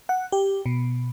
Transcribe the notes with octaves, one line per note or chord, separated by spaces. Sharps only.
F#5
G4
B2